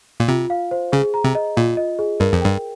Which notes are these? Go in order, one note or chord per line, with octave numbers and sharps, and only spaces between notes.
A#2
C3 F4
F5
C5
C#3 G#4
A#5
C3
D#5
A#2 F4
D#5
G#4
G2 A#4
F2
G2 G5